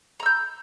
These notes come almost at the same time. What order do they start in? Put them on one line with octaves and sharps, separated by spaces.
A#5 E6 G6